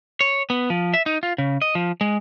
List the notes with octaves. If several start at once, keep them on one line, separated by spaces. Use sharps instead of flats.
C#5
B3
F3
E5
D#4
F4
C#3
D#5
F3
G#3